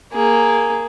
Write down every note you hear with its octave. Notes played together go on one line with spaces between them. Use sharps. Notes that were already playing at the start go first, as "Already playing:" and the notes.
A#3 G#4